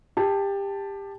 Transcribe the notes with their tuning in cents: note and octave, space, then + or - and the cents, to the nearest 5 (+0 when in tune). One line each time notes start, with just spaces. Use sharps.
G4 +20 A5 +0